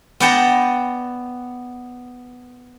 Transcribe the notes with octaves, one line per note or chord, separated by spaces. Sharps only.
B3 D5 F#5 G5 A5 A#5